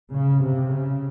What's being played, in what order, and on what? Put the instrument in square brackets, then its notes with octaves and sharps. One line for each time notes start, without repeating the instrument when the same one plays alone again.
[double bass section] C#3
C3
C#3